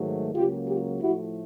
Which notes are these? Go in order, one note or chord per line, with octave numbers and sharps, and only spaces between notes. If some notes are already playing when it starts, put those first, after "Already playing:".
Already playing: G#2 D#3 F#3 A3
C#2 C#3 F#3 A#3 F4 G4
F4 G4
A2 F3 A3 E4 F#4